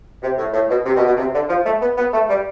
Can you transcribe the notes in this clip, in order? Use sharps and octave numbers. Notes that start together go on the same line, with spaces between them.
C3
A2
A2
B2
C3
B2
B2
C3
D3
F3
A3
B3
B3
A3
G3